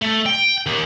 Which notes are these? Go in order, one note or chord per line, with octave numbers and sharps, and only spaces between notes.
A3
G5
D#2